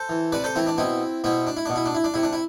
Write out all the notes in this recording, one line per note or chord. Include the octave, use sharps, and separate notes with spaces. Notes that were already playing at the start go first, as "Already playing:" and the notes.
Already playing: A4 C5
E3
C3 B4 D5
A4 C5
E3 C4 E4
D4
B2 C4 E4
B2 C4 E4
D4
E4
B2 D4
E4
D4
E4
D4
C3 E4
D4
E4